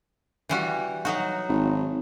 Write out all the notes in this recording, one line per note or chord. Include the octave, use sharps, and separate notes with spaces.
E3 G3 F#4
F#3 D#4 F#4
G#1